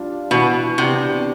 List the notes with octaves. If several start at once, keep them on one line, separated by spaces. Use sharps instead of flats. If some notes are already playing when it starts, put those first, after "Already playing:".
Already playing: G3 D4 F4
B2 E3
C3 B3 D4 G4